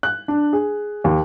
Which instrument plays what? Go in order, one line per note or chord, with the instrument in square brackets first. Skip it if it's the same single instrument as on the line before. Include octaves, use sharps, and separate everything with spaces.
[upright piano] F#6
D4
G#4
D#2